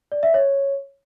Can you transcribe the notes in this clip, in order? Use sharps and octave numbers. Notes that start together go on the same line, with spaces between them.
D5
E5
C#5